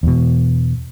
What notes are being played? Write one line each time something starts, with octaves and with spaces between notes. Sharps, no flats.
E2 B2